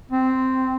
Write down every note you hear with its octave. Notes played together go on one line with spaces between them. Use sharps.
C4